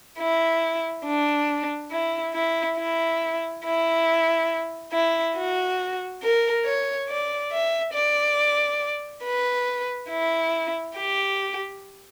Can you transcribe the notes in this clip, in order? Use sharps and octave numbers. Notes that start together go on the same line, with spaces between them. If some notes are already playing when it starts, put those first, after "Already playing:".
E4
D4
E4
E4
E4
E4
E4
F#4
A#4
C#5
D5
E5
D5
B4
E4
G4